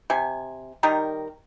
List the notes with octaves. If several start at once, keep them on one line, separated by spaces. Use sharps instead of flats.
C3 G#5
D#3 G3 D#4 A#4